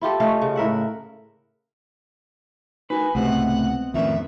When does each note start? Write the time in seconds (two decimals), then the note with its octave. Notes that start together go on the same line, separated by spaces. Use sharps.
0.01 E4 F4 G4 A4
0.20 A3 C#4 D#5 F5
0.42 C#3
0.56 A2 A#4 E5 F#5
2.90 D#4 F#4 A#4 B4 G#5
3.15 C#2 A2 C3 G#3 B3 C4 F#5
3.94 F2 A2 D#3 E3 C#4 A#4 E5